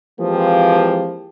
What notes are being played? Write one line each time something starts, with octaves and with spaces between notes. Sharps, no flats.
E3 F3 G#3 A#3 C4 G4